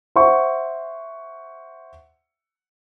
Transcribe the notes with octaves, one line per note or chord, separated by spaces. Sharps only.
C5 E5 F#5 C#6